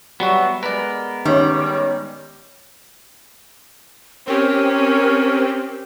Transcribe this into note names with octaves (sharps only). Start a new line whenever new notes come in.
F#3 G3 B3 F#4 E5
G#3 B3 A#4 B4 D5
D#3 G3 C#4
C4 C#4 G4 A#4